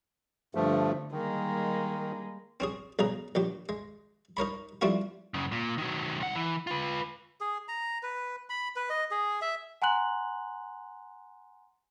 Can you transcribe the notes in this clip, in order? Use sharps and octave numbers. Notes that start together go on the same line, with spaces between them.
G2 D3 F3 A3
D#3 G3 G#3 A#3
C4 C#4 G#4
B1 C#3 G#4 A#5
A#1 F#3 G4
G#3
D#4 A#4 C#5 B5
F3 G3 A3 C4 E4 F#4
F#2 C#3
A#2
D#3 F#3
C2 F#5
E3
F4 B4
G#4
A#5
B4
B5
B4
D#5
G#4
E5
F#5 G#5 A#5 C6 F#6 F#7